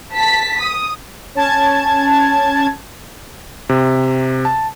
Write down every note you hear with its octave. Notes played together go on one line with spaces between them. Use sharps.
A5 B6
D#6
C#4 A5 G#6
C3
A5